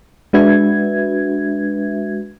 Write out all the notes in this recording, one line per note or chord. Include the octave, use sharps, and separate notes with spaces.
G#3 D4 F#4 B4 E5 G#6